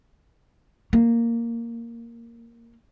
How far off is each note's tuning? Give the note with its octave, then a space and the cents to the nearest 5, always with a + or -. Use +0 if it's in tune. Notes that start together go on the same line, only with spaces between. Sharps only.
A#3 -5